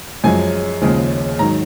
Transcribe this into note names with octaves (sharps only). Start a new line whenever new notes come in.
F#2 F3 G#3 G#5
D#2 C#3 F3 G#3
G#2 D#3 F#3 A#5